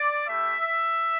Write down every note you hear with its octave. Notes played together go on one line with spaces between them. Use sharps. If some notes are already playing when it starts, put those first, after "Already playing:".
Already playing: D5
A3 E4 G4 E5